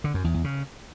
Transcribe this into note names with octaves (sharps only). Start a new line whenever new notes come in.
D3
F#2
E2
E2
C#3